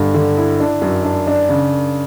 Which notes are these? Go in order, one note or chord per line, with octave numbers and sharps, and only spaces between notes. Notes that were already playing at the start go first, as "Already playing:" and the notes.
Already playing: G2 D3
D3
E4
D4
F#2
D4
D4
C#3